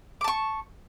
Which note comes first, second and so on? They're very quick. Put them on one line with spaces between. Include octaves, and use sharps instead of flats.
D6 A5 C#6